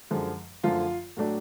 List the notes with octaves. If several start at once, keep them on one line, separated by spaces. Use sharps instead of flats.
F#2 D3 F3 G#3
F#2 D3 F3 A3 F4
A2 F#3 A3 D4